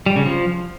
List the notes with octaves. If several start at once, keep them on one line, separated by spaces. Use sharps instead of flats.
G3
C#3
F3